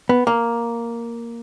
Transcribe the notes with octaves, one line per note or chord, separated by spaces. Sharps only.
B3
A#3